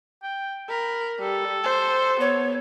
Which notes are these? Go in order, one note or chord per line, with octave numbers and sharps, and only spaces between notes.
G5
A#4 B5
G3 A4
C5
B3 C#5